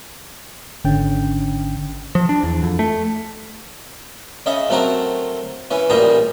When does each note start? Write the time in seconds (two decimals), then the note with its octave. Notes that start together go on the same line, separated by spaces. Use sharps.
0.85 G#1 D3 C#4 G5
2.15 F3
2.29 D4
2.43 E2
2.63 F2
2.79 A3
4.46 C#3 D#5 E5 G#5
4.69 F#3 A3 C4 F#4 A#4
5.71 E3 C#4
5.90 A1 A#2 G3 G#4 G5 A#5